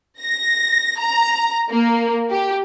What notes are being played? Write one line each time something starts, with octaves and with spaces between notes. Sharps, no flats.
A#6
A#5
A#3
G4